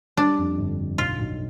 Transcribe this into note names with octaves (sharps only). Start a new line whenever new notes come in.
G3 D4
F2
G1
G1
B1 F4
B1